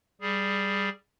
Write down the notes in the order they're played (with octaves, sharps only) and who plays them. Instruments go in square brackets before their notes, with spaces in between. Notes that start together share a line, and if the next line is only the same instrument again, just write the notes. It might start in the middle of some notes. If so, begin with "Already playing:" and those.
[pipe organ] G3 G#4